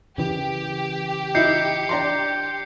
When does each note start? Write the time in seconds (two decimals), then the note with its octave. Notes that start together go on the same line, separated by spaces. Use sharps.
0.18 C#3 E3 G4
1.35 D#4 E4 G6 C7 C#7
1.89 D4 A#5 C6